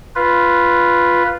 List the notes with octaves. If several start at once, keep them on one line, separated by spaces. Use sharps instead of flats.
F4 B4